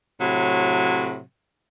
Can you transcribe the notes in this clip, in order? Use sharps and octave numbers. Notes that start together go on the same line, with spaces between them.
A2 C3 F#3